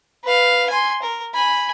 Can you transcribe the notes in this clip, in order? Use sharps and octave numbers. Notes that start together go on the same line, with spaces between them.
B4 F5
G#5 C6
A#4
G#5 B5